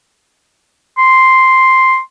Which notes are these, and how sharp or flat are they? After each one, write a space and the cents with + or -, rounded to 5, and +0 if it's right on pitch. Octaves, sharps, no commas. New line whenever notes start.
C6 +0